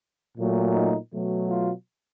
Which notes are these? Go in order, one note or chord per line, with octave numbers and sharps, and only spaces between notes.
A#2 F#3 A3
D#4
B2 F#3 A3
F4